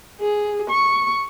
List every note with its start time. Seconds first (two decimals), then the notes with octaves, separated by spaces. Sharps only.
0.20 G#4
0.70 C#6